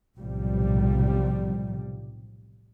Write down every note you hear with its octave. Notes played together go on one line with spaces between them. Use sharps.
B1 A2 C3 F3 G3